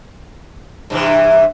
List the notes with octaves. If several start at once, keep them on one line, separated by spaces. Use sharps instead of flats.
G2 C3 E3